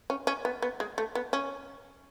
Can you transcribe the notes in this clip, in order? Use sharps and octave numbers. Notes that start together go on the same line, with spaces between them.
C#4
C#4
B3
B3
G#3
A3
B3
C#4